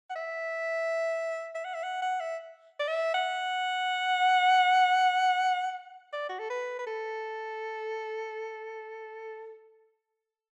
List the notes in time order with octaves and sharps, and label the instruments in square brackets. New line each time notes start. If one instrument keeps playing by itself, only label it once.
[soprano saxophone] F#5
E5
E5
F#5
E5
F#5
F#5
E5
D5
E5
F#5
D5
F#4
A4
B4
B4
A4